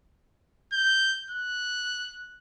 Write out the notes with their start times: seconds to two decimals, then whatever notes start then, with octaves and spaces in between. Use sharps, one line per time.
0.73 G6
1.30 F#6